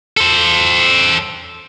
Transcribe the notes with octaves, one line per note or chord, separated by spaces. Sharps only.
A4 C5